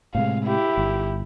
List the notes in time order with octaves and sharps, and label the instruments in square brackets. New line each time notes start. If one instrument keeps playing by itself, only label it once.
[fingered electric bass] A2 C3 G#3 [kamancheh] F5
[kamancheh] E4 G4
[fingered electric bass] G1